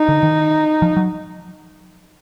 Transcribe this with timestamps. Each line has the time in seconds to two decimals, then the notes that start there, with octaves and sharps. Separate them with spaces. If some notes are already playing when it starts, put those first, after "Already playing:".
Already playing: D#4
0.08 D3
0.23 D#3
0.82 F3
0.97 F#3